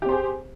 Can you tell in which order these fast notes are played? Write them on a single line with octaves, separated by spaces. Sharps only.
G4 C4 C5 G#4